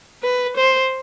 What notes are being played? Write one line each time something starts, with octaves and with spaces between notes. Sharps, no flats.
B4
C5